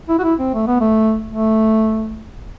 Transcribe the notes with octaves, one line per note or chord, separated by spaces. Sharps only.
E4
F#4
E4
C4
A3
B3
A3
A3